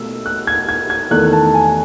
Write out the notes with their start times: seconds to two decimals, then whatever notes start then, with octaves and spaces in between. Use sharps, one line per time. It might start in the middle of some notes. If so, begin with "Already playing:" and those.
Already playing: B2 A3 E6
0.26 F#6
0.47 G#6
0.69 G#6
0.90 G#6
1.11 E2 D#3 A3 F#6
1.33 A5
1.54 G#5